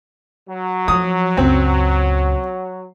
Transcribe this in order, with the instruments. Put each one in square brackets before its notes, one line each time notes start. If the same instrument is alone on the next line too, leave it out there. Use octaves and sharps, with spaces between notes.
[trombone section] F#3
[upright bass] F3 [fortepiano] D#6
[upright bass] C#2 F#2 [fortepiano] C4